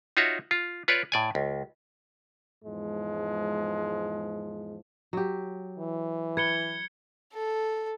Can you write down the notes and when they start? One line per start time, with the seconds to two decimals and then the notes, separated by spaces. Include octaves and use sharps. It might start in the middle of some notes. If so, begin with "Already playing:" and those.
0.17 D#4 F4 F#4 C#5 E5
0.51 F4
0.88 F4 B4 C#5 D5
1.12 A2 D5 G#5
1.35 C#2
2.65 E2 G#2 F3 G#3
5.13 F#3 G4
5.79 E3
6.37 B4 G#6 C#7 G7
7.34 A4